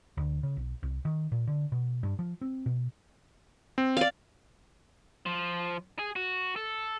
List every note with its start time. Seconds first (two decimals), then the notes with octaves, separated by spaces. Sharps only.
0.17 D2
0.43 C#3
0.57 B1
0.83 C2
1.05 D#3
1.32 A#2
1.47 D3
1.72 B2
2.03 G2
2.19 F3
2.41 C4
2.66 B2
3.78 C4
3.97 D5 F5
5.26 F3
5.99 G#4
6.16 F#4
6.56 A4